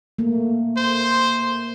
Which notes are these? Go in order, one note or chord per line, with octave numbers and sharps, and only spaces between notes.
A3 A#3
C5